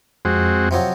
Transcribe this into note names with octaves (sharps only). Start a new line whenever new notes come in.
F2 G#3 C4 F#4
C3 F3 F#3